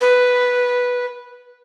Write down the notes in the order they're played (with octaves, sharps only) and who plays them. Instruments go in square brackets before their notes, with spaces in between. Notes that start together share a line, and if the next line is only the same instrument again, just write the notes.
[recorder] B4